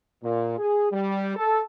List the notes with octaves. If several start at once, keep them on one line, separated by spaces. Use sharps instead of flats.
A#2
G#4
G3
A4